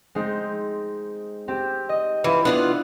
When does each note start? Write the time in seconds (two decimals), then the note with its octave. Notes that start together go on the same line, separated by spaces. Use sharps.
0.15 G#3 C4 D#4
1.48 C4 G4
1.89 D#5
2.24 E3 E4 F4 E5
2.45 B3 D4 F4 F#5